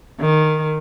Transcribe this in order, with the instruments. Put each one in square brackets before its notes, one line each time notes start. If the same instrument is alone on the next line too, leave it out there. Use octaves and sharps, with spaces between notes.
[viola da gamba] D#3